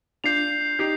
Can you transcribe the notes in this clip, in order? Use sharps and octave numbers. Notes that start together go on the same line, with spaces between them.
D4 F4 G6 C7 F7
D#4 G4 G6 C7 F7